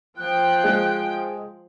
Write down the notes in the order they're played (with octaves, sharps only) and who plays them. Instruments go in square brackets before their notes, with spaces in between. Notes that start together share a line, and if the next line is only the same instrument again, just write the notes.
[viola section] F3 G5 [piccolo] F#6
[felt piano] G#3